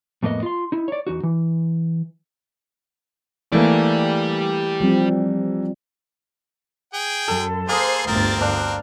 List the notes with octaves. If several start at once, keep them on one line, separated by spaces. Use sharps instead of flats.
F2 A2 A#3 B3 D#5
F4 C6
D#4 E4
C#5 D5
E2 D#4 F#4
E3
E3 A3 A#3 G4 D5
F3 G3 C4
G#4 G5
F#2 A4
A#3 G#4 A4 C5 D#6 C7
G1 D2 C4 A#4 A6
D4 F5